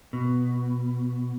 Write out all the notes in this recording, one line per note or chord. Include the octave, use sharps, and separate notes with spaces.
B2